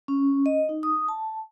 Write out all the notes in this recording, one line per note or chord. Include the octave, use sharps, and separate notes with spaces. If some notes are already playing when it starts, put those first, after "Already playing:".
C#4
D#5
D#4
D#6
A5